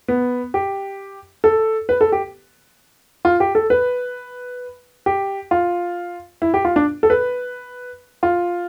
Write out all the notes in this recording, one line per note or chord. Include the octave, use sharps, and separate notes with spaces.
B3
G4
A4
B4
A4
G4
F4
G4
A4
B4
G4
F4
E4
G4
F4
D4
A4
B4
F4